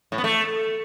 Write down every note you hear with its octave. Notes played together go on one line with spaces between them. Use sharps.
A2
B3
A3